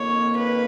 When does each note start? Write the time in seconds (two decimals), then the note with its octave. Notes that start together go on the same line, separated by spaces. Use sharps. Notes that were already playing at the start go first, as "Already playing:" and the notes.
Already playing: F2 D#3 A#3 C#5
0.37 B4